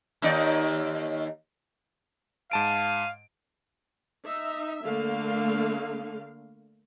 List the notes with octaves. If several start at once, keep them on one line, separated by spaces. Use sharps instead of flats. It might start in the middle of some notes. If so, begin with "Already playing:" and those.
D#2 D#4 D5
G#2 F5 A5 D7 D#7
D#4 E5
D3 A3 A#3 F5